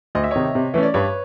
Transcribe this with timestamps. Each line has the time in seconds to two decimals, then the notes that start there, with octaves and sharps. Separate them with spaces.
0.15 D2 D#5
0.24 E5
0.31 C3 D#3 C#5 D#5
0.55 C3
0.74 E3 A3 C#4
0.83 D5
0.94 G2 B4 C#5